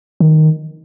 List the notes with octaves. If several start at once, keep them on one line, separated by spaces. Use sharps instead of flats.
D#3